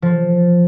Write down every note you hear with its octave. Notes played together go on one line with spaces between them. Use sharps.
F3